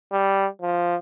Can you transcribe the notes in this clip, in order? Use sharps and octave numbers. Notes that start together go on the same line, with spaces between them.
G3
F3